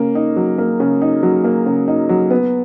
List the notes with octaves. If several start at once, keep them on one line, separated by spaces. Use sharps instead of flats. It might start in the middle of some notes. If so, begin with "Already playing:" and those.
Already playing: C#3 A#3
D#4
F#3
A#3
C#3
D#4
F#3
A#3
C#3
D#4
F#3
B3